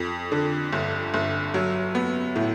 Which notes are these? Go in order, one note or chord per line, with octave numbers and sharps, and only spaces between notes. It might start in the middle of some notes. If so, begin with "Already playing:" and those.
Already playing: F2
D3
G1
G1
F#3
B3
A2